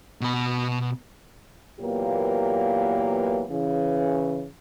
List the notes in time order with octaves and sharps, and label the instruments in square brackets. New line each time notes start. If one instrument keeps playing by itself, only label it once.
[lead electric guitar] B2 B5
[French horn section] A#2 E3 F#3 A#3 B3 G4
C#3 E3